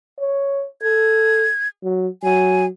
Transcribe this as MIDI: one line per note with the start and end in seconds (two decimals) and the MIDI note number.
0.20 0.66 73
0.82 1.46 69
0.82 1.68 92
1.83 2.08 54
2.23 2.68 54
2.23 2.66 80